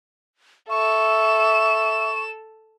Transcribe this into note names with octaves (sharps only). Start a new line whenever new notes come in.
A4 E5 C#6 E7